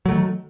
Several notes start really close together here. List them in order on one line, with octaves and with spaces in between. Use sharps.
F#3 A3 D#3